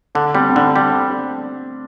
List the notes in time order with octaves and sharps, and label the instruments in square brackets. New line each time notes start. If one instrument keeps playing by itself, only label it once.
[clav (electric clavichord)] D3 [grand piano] D4
[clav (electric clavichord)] G3 [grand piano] C4
[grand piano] C4
[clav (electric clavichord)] D3 [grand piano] D4
[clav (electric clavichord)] G3 [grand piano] D4